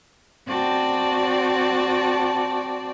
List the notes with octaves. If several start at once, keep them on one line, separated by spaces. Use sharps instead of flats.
C4 F#4 D5 G5 A5